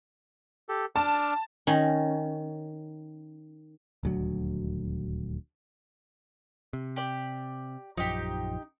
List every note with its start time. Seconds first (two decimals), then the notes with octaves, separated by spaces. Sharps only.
0.69 G4 A4
0.96 D4 A5 D6 F6
1.67 D#3 C#4
4.03 D#1 D2 F#3
6.73 C3
6.96 G4 D5
7.97 A#1 F#2 F3 D#4 G4